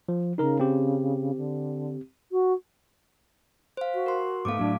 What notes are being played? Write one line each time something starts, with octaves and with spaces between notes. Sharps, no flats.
F3
C#3 D#4 A#4 A#5
C4 G4
D3
F#4
C5 F5
F#4
A#4 C6
G#2 A3 B3 F5 D6
A2 F#3 D4